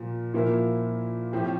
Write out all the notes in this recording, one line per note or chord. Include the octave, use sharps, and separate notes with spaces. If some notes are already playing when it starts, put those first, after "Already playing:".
Already playing: A#2 F3
A#2 F3 A#3 E4
A2 F3 C4 G4